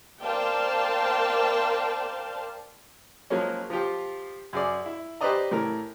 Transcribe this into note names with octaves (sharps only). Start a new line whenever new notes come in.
A#4 C5 D5 F5 G5 A5
F3 F#3 G#3 A#3 C#4
F3 F4 G4
F#2 G#4 D5
E4
G4 B4 C5 D5 D#5 A#5
A2 E3 A#4